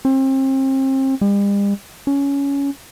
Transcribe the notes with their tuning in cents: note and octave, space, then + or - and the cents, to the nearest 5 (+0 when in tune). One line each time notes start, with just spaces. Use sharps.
C4 +35
G3 +45
C#4 +15